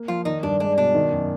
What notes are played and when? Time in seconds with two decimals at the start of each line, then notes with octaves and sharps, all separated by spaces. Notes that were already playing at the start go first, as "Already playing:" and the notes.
Already playing: A#3
0.08 F3 F4
0.25 D#3 D#4
0.43 G2 D4
0.60 G#3 D4
0.78 B2 D4
0.94 D#3
1.12 F#2